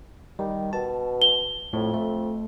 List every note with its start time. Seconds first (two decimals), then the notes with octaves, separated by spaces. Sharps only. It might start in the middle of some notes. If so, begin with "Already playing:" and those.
0.39 D#3 G3
0.73 B2 A5
1.22 G7
1.73 F2 A2
1.94 A3